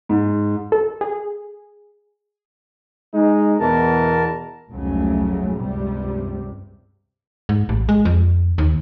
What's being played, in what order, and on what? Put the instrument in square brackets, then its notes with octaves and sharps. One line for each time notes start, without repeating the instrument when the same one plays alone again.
[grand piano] G#2
[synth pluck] A4
G#4
[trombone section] G#3 D#4
[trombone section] E2 B2 E3 [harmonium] A#4 A5
[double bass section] F1 C#2 G2 C#3 F#3 A3
C#2 G2 C3 G3
[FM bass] G#2
A1
G#3
F2
D#2